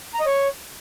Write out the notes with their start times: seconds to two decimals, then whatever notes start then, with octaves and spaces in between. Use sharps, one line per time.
0.14 A#5
0.20 D#5
0.26 C#5